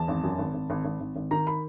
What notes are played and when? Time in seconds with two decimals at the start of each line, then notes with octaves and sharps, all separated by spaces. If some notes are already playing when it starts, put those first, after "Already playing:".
Already playing: E2 A5
0.08 G#1
0.23 F#2
0.38 G#1
0.54 G#1
0.70 G#1
0.85 G#1
1.00 G#1
1.16 G#1
1.31 D#3 A#5
1.47 B5